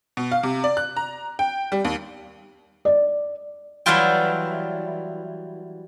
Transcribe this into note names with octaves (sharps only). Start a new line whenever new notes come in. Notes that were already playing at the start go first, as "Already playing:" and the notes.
B2
F5
C3
D5
F#6
A#5
G5
G3
D#2
D5
E3 F#3 G3 E4 F4 G5